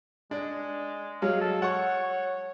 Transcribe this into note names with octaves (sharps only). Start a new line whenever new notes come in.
G#3 D4
F#3 G#3 F5
A4
C#5 F#5 C#6